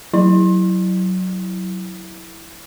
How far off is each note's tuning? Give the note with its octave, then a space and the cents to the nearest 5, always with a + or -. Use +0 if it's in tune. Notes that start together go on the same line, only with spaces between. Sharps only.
F#3 +0 E4 +0